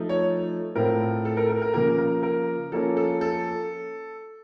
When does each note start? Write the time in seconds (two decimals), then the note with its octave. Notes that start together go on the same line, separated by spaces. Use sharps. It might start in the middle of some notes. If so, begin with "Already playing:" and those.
Already playing: F3 A3 D#4
0.09 C#5
0.75 A2 A3 C4 F4 A#4
1.25 A4
1.37 A#4
1.49 A#4
1.62 A#4
1.74 C#3 F3 A#3 A#4
1.98 A#4
2.23 A#4
2.72 F3 A#3 C#4 F4 A4
2.97 A4
3.21 A4